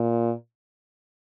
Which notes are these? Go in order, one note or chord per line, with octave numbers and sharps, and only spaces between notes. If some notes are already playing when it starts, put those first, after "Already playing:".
Already playing: A#2